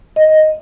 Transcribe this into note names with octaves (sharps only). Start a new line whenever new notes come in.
D#5